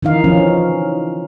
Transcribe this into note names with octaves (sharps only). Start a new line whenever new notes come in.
D#3 E3 D#4 F5
F3 C#4 D#4